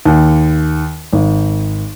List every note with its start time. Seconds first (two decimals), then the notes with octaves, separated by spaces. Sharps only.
0.06 D#2
1.13 G#1